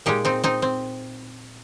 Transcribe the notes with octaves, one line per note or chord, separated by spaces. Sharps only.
A#2 G#3 D#4 G4
C4 D#4
C4 D#4
C4